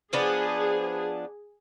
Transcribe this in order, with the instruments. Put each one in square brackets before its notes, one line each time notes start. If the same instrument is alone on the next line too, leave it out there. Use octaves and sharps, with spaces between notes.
[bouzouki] F3 B3 D4 [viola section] G#4